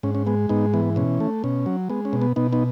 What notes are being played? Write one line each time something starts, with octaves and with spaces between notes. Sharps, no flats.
G#2 C#4
C#4
G#3 B3
G#2 B3 D#4
E3 B3
B2 C#4
A3
B2 C#4
F#3
G#3 B3
C#4
B2
B3
B2 B3 D#4
B3 D#4